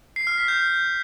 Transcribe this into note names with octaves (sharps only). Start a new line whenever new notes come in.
C7
F6
B6
G6